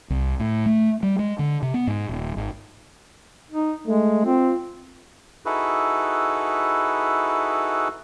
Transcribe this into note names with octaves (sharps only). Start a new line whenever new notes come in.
C2
A2
A3
G3
G#3
D3
C3
B3
G#2
D#1
G#1
D#4
G#3 A3
C4 F4
D#4 E4 F#4 G#4 A4 B4